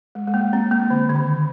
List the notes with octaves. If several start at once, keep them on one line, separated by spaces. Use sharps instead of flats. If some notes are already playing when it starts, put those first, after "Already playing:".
G#3
G#3
A#3
C4
A#3
D3
D3
D#3